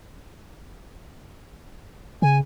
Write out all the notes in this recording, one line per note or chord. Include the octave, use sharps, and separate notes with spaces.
C#3 G#5